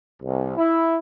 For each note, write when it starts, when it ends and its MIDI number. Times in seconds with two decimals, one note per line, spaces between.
0.23 0.56 36
0.56 0.96 64